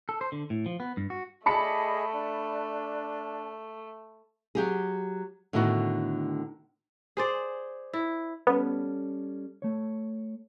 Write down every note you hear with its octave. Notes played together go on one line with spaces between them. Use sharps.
A4
C5
D3
A2
F3
B3
G2
F#4
A3 G#4 D5 D#5 A5 B5 C#7
D4
F#3 G4 G#4
A2 D3 D#3 B3 F#4
G#4 C5 D5
E4
G3 B3 C#4 A4
A3 C#5